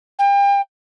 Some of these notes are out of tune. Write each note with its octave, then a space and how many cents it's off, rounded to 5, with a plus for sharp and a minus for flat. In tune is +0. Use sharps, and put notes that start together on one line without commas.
G5 +35